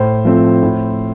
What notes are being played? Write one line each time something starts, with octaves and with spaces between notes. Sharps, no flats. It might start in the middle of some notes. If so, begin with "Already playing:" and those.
Already playing: A2 C5
F3 A3 C4
A2